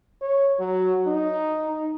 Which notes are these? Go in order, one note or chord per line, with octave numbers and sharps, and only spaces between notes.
C#5
F#3
D#4